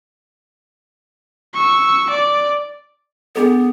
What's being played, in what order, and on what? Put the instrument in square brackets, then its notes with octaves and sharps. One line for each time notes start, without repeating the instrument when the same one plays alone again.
[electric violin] C#6 E6
D5
[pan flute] B3 [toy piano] D4 G#4 A4